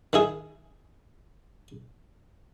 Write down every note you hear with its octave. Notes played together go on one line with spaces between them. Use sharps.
D#3 E4 G#4